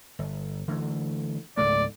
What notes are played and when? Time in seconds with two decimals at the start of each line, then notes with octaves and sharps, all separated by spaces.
0.19 G1
0.68 D3 E3 A3
1.57 C#2 G#2 A3 D5